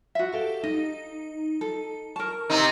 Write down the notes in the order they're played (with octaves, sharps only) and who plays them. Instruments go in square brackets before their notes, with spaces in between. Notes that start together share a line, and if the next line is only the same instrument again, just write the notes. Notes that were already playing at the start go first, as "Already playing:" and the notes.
[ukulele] F#4 E5
[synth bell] G4 A4 F5
[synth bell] D#4 [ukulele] D#5
[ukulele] A4
[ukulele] A#4 A5 [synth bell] C#6
[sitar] C3 C4 D#4